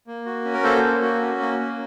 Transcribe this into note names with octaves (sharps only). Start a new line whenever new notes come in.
A#3
F#4
C#4
A#4
A#3 A4 C5
A#3
F#4
C#4
A#3
A#3